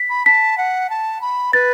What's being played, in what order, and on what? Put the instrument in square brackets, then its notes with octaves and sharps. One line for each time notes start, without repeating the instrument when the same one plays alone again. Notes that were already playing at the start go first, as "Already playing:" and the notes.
Already playing: [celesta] B6
[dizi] B5
[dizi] A5 [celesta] B6
[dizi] F#5
A5
B5
[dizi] B4 [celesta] A6